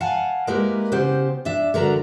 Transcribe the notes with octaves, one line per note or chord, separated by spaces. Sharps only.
F5 F#5 G#5 A5
G#3 A#3 E4 G4 A#4 B4
C#3 B3 G4 C5
D4 E5
D3 F#4 A#4 B4 A#5